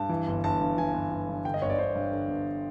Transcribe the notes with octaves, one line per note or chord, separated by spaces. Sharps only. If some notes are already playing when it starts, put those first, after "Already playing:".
Already playing: G2 A5
E3
G1
G1 A5
G2
E3 G#5
G1
G1
G2
D3 G5
D#5
G1 C#5
D5
G1 C5
G2
D3
G1